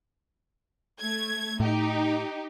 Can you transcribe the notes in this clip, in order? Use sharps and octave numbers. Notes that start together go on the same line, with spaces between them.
A3 G#6
A2 D#4 G4